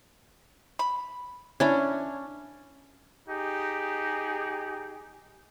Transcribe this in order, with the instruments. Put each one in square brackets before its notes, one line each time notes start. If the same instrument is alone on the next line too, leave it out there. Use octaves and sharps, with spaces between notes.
[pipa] B5
[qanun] C#4 D4 [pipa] E4
[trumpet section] D#4 G4 G#4